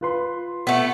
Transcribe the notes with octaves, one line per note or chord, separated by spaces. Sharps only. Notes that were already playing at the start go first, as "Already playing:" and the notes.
F4 B4 C6
A3 B3